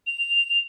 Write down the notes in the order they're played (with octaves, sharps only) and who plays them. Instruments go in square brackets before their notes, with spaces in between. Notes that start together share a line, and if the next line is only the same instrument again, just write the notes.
[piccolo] F7